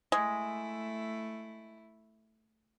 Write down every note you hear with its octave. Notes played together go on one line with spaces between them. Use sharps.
G#3 A3 E4